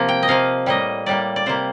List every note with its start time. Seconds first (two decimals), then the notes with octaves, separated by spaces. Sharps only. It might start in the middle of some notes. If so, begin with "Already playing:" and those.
Already playing: C3 F3 A#3
0.09 G5
0.23 D#5
0.28 C3 F3 A#3 F5
0.66 A2 G3 A#3 D#5
1.06 A2 G3 A#3 D5
1.36 D5
1.46 C3 G3 A#3 C5